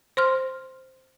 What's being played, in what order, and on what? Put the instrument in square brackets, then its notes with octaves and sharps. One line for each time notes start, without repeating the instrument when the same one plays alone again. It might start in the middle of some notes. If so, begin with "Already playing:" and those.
[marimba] C5 C6 F6